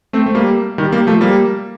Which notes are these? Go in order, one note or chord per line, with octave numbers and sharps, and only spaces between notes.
A3 C4
A3
G3 A#3
D#3 G3
G3 A#3
F3 A3
G3 A#3